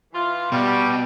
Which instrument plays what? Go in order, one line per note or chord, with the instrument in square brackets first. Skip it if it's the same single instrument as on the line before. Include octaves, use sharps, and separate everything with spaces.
[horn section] E3 F4
[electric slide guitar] B2 [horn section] G3